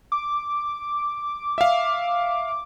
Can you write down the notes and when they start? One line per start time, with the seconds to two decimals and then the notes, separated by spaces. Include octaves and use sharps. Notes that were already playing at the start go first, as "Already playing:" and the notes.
0.12 D6
1.58 E5 F5